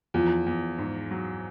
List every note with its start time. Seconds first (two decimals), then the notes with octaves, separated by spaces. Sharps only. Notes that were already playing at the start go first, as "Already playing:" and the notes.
0.14 E2 F3
0.46 E2
0.78 G#2
1.10 F#3